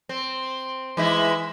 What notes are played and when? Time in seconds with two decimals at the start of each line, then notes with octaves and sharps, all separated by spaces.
0.09 C4
0.97 E3 G#3 E4